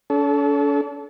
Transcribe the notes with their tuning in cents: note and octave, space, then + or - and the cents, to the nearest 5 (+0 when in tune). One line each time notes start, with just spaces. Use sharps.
C#4 +45 A4 -20